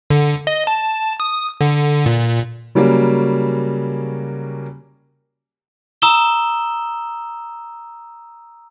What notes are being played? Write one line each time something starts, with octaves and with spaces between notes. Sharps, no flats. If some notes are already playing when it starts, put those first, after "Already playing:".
D3
D#5
A5
D#6
D3
A#2
C#3 F#3 G3 A#3 C#4
A#5 D#6 E6 E7 G7